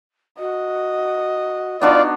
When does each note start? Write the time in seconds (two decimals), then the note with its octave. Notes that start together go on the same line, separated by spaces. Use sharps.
0.39 F#4 D#5
1.82 B3 D4 D#4 F4 F#4 D5